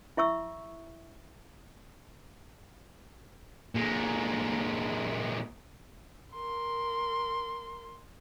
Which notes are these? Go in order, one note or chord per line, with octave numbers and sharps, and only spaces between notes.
E4 E5 C#6 E6
A#2 G#3
A#4 C6